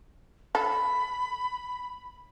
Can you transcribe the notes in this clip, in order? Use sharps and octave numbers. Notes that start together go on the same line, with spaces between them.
A4 B5